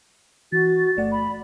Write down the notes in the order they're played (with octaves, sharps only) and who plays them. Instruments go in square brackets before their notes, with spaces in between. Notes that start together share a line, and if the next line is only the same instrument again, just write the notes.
[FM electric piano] E3 [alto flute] F#4 [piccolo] A6
[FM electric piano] G1 A3 F#5 [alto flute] D5
[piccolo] B5